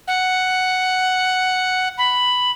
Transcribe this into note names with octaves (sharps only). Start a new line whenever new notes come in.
F#5
B5